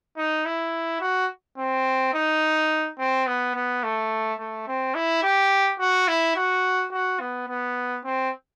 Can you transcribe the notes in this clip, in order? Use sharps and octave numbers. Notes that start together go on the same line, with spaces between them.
D#4
E4
F#4
C4
D#4
C4
B3
B3
A3
A3
C4
E4
G4
F#4
E4
F#4
F#4
B3
B3
C4